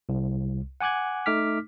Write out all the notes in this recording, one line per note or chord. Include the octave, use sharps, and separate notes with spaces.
C2
F#5 G#5 D6 F#6 G#6
A3 D#4 D6 F6 B6